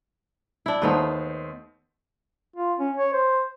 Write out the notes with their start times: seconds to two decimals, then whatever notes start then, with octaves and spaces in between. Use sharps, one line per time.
0.66 D4 E4
0.82 D#2 A3 B3 D#4 B4 C5
2.56 F4
2.79 C#4
2.97 C#5
3.13 C5